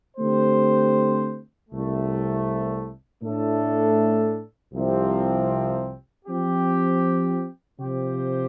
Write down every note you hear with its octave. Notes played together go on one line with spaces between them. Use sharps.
D3 A3 C4 G4 C5
C2 C3 A3
A2 A3 D4 A4
C2 C3 F3 C4
F3 C4 G4
C3 F3 C4 G4 C5